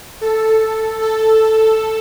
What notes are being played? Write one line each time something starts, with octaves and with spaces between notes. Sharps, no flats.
A4
A4